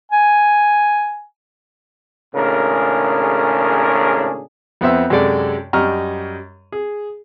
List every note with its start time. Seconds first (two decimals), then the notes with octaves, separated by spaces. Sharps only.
0.12 G#5
2.34 G#1 A2 C#3 D4 G#4 A#4
4.81 F2 B3 C4 E5 E6
5.10 F#2 C3 G#3 A4 D5 A5
5.73 F#2 G3 D#5 A#5 C#6 F6
6.72 G#4